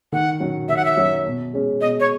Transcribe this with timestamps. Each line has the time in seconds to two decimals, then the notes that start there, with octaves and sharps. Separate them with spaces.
0.12 D#3 F#5
0.40 F#3 C#4 F#4
0.68 D#3 E5
0.76 F#5
0.85 E5
0.97 F#3 C#4 F#4
1.25 B2
1.53 G#3 C#4
1.81 B2 D#5
1.99 C#5